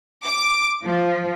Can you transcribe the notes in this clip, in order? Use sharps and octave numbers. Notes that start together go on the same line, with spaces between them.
D6
F3